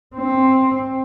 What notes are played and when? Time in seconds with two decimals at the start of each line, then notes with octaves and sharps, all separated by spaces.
0.15 C4